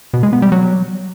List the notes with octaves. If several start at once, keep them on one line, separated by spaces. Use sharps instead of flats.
B2
G#3
B3
G3
F#3